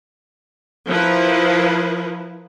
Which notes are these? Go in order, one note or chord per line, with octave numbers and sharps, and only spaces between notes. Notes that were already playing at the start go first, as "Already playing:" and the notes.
F3 E4 A#4 B4